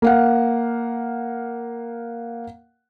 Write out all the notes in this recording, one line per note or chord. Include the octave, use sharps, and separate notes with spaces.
A#3 F5 F#5